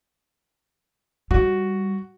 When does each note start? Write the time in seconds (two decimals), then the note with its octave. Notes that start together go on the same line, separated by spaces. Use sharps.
1.31 G3 F#4